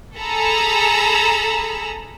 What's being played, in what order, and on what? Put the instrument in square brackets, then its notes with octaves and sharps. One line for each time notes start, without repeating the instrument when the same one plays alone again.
[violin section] G#4 A4 A#5 B5 E6